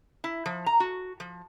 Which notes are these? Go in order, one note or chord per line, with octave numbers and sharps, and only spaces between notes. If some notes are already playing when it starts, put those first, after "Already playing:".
E4
F3
A#5
F#4
F3